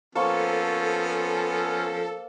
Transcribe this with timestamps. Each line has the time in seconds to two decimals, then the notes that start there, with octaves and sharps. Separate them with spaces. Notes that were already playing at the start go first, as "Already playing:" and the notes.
0.15 F3 A#3 B3 C#4 A4 C5 C#6